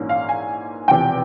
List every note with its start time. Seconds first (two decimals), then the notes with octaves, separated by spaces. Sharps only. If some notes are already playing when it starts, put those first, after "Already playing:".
Already playing: A#1 G#2 E3 A#3 C#4
0.09 F5
0.29 G#5
0.88 E1 E2 C3 F3 G5